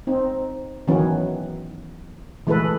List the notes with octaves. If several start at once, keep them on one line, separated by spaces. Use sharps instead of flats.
C4 D#4
D#3 E3 F#3 B3 C#4
E3 G#3 A3 A4 B4